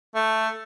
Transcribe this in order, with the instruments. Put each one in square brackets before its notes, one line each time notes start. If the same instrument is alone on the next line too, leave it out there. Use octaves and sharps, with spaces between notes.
[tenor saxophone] A3